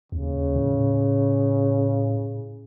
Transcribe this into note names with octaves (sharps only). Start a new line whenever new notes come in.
D#2 C#3
A2